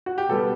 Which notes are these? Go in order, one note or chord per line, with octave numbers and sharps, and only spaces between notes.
F#4
G4
B2 G3 B3 A4